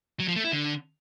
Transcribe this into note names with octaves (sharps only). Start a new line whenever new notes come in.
F#3
F3
A3
E4
D3